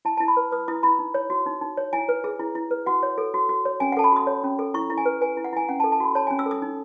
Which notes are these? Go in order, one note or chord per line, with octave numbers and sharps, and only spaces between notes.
E4 A5
E4 A5
B5
B4
B4 D#6
E4 D#6
E4 B5
D#4
C#5
F#4
D#4
D#4
C#5
E4 G#5
B4
G#4
E4
E4
B4
F#4 F#5
C#5
A4
F#4
F#4
C#5
C#4 G#5
F#5
A4 A5
B5
F#4 D#6
C#5
C#4
A4
E4 C#6
E4
G#5
B4
B4 G#5
E4
F#5
E4 G#5
C#4 F#5
A5
A4
A5
F#4 B5
C#5 A5
G#5
C#4
E6
A4
D#6
D#4